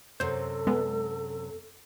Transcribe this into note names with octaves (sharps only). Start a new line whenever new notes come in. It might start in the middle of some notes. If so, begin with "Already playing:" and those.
F#2 C3 A4 C5
G#3 B3